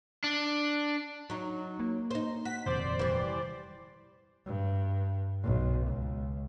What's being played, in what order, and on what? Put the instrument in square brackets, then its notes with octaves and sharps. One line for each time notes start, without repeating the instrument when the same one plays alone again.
[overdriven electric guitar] D4
[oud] F#3 D#4
[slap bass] A#3
[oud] D#4 C5
[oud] F#4 [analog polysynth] B6
[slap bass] D#1 F2 C3 [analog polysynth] C5 D5
[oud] E3 G3
[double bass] G2
B1
C#2